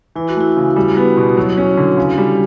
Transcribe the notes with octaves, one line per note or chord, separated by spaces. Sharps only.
E3 E4
F#4
A3 E4
C#3
G3
B3
B2
F#3
C#4
D3
C#3
G3